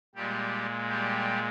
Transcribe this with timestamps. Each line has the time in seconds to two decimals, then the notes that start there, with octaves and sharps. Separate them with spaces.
0.15 A#2 G3 G#3 G4
0.88 G3 G4